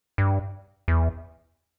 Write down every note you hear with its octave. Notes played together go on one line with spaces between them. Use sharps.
G2
E2